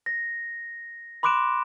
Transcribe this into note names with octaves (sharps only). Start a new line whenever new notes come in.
A#6
B5 C6 D6 F#6 D7 E7